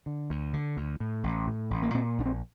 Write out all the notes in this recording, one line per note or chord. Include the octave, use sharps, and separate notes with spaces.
D3
D2
D3
D2
A2
A1
A2
A1
A#3
A#2 C4
A#1 D4
C4